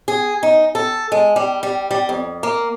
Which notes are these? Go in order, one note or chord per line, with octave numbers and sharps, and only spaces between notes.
G#4
D#4
A4
G#3
G3
G3
G3
F2
A#3